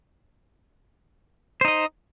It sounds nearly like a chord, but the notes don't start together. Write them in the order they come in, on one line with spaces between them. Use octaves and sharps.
C5 D#4 D#5